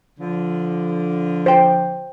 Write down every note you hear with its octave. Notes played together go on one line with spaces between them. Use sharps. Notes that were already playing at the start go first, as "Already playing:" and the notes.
D3 F3
C5 G5